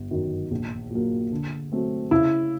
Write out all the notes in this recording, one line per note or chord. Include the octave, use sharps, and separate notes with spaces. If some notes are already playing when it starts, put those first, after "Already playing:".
Already playing: G1
F#2 D#3 F#3
A#1
A#2 F#3 A#3
D3
F#3 A3 C4
C#3 E4